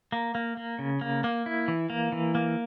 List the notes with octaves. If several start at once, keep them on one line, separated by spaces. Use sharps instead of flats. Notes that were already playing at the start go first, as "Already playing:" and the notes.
A#3
A#3
A#3
C#3
A#3
A#3
E4
E3
A#3
E3
A#3